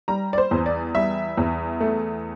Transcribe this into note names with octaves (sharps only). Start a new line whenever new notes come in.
G3 A#5
D5
C5
E2
D5
G3 E5
E2
A3